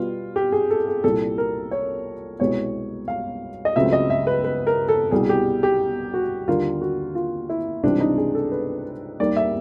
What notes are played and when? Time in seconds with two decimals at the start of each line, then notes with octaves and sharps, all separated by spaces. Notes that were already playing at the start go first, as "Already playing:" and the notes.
Already playing: B2 G3 B3 F4
0.36 G4
0.52 G#4
0.70 A4
0.87 G#4
1.04 C2 A#2 G3 A4
1.38 A#4
1.71 C#5
2.39 C2 B2 G#3 B3 C#5
3.08 F5
3.65 D#5
3.76 C#2 C#3 F#3 A3 C4 E5
3.93 D#5
4.10 E5
4.27 B4
4.44 B4
4.67 A#4
4.88 A4
5.11 C2 B2 G3 G#4
5.29 G4
5.63 G4
6.14 F#4
6.47 D#2 D3 G3 A#3 F4
6.81 F#4
7.15 F4
7.49 E4
7.83 C#2 C3 E3 G3 C4 D4
8.00 D#4
8.18 G#4
8.35 A4
8.52 B4
9.20 D#2 D#3 G3 A#3 D5
9.36 E5